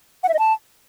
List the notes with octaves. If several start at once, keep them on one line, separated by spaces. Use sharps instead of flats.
F#5
E5
D#5
A5